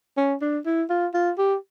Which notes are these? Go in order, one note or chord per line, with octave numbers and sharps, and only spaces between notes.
C#4
D4
E4
F4
F4
G4